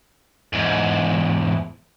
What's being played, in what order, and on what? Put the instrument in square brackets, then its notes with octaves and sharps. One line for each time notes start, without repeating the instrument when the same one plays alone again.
[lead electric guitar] E2 G#2